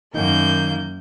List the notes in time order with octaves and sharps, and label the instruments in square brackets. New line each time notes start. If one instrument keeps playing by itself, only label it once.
[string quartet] F#2 A#3 G6 [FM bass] D#3